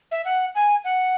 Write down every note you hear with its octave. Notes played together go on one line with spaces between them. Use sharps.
E5
F#5
G#5
F#5